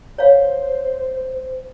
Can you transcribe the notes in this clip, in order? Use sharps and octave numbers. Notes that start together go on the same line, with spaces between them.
C5 C#5 F5